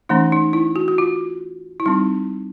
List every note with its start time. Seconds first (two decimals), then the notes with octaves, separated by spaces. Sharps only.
0.09 E3 A3 C#4 D#4
0.32 D#4
0.53 E4
0.76 F#4
0.88 F#4
0.98 F4
1.80 E4
1.86 G3 C4 D#4